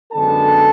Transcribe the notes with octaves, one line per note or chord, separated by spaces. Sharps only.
F#2 D3 G#3 B3 D4 A4 A5